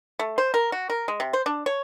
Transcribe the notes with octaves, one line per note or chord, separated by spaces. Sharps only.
A3
C5
A#4
F#4
A#4
G#3
C3
C5
D4
C#5